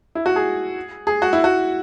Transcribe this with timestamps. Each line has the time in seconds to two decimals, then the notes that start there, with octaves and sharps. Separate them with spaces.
0.15 E4
0.26 F#4
0.36 G#4
1.07 G#4
1.22 F#4
1.33 E4
1.44 F#4